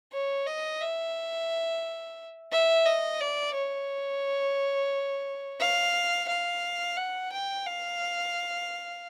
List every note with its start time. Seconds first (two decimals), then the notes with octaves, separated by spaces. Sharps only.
0.13 C#5
0.46 D#5
0.81 E5
2.52 E5
2.86 D#5
3.20 D5
3.55 C#5
5.60 F5
6.28 F5
6.97 F#5
7.32 G5
7.66 F5